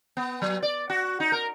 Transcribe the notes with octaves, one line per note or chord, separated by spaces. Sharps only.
B3
F#3
D5
F#4
D#4
A#4